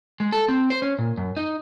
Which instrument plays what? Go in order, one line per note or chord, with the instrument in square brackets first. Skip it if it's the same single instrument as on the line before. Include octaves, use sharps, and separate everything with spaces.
[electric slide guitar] G#3
A4
C4
C5
C#4
A#2
F#2
D#4